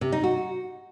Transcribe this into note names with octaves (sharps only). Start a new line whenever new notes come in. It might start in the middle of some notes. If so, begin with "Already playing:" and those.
C3
D#4
F#4